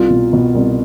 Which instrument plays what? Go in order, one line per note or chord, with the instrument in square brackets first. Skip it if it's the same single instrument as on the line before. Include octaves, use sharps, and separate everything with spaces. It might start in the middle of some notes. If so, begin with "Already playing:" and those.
Already playing: [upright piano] C2 F4
B2
B2
C2